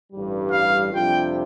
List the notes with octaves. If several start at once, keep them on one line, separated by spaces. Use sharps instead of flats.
A1 G2 G3
F5
F2 C3 G3 D4 F4 G5